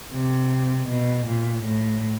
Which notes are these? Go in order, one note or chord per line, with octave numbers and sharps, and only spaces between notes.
C3
B2
A#2
A2